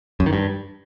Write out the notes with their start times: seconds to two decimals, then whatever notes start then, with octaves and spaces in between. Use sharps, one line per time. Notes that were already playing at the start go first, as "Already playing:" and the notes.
0.20 F#2
0.26 D#3
0.33 G2